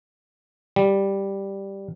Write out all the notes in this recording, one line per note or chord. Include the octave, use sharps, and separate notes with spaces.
G3